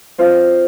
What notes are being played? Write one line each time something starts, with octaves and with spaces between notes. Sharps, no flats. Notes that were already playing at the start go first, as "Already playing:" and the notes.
C4 F4 C5 D#5